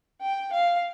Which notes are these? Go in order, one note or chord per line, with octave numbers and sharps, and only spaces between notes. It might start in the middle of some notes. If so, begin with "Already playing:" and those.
G5
F5